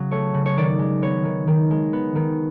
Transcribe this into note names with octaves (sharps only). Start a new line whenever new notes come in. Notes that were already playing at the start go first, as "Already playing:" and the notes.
Already playing: C#3 F#3
A3 C#5
C#3
C#5
D#3 D5
G#3
B3 C#5
D#3
D#3
G#3
B3
D#3